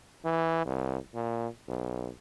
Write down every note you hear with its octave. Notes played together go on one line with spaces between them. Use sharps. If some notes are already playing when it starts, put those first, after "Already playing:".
E3
C2
A#2
B1